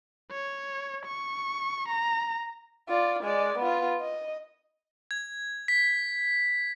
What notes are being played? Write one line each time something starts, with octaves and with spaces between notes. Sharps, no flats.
C#5
C#6
A#5
F4 D5
G#3 D5
B3 F4
D#5
G#6
B6